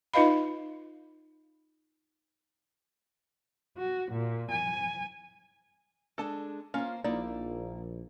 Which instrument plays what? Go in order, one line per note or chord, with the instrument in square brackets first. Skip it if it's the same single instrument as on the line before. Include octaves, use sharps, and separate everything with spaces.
[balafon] D#4 F4 B4 D#5 F5 B5
[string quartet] F#4
A#2
G#5
[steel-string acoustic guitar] G#3 D4 G#4 [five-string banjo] A4 A5
[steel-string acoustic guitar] A#3 C5 [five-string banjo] C#4 F4
[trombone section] A#1 [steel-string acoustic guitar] A#3 [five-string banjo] D#4 E4 D5